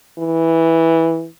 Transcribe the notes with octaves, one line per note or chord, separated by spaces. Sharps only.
E3